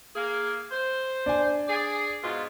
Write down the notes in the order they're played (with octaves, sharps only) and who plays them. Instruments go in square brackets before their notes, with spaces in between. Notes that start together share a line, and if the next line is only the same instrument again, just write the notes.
[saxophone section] A#3 G#4
C5
[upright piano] D4 G#5
[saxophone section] G#4 D5
G#2 B2 F4